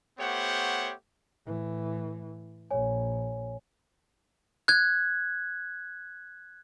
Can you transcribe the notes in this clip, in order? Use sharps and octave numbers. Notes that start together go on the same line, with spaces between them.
A3 B3 G4 C5 C#5 F#5
A2 E3
A#1 C#5 G#5
F#6 G#6